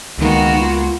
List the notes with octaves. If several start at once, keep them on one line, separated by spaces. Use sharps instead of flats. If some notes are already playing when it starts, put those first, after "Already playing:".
C#2 D#3 G#3 A#3 B3 F#4
F4